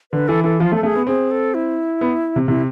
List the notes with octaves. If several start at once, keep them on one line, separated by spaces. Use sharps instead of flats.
D3 B4
E3 A4
E3 A4
F3 F4
A3
A4
A3 G#4
B3
C4 G#4
A4
E4
B3
C3
C3 E4